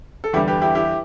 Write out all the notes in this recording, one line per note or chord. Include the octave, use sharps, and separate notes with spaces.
A4
E2 D3 G3 E4 G4
G4 B4
E4 G4
E4 G4